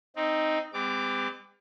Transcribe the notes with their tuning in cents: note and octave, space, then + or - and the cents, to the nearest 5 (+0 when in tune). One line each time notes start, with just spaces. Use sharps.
C4 +0 D#4 +0
G3 +45 C4 -45 D6 +0